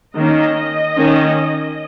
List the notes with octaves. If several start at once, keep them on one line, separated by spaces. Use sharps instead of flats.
D#3 A#3 C#4 D#5
D#3 A#3 C#4